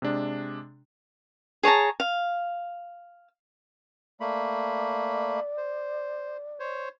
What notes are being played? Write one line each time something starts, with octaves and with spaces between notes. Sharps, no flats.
C3 G#3 D4
G#4 C#5 A5 A#5
F5
A3 A#3 D5 B5
C5
C5 C#5